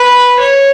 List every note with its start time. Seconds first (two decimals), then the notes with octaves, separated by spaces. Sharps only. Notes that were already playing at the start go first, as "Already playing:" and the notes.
Already playing: B4
0.40 C#5